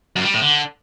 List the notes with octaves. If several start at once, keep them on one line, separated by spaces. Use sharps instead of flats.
F#2
G3
A2
D3